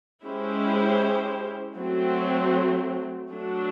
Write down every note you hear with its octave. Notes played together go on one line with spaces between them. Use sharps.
G#3 C#4 E4 G4 C5
F#3 A3 C4
F#3 A3 D4